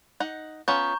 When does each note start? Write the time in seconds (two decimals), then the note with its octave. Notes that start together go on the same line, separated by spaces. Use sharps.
0.20 D#4 F#5
0.68 B3 C#4 F4 A#5 C#6 G6